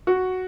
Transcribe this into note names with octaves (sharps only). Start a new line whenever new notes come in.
F#4